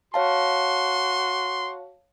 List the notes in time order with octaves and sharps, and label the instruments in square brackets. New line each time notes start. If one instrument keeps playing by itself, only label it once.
[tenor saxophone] F#4 [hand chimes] C#5 F5 A5 [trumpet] C6